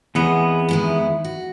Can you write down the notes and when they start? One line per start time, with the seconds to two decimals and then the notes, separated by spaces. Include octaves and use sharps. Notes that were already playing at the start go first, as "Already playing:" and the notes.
0.15 E2 B3 C4 G#4 D#5
0.69 D#3 G#3 E4
1.25 F#4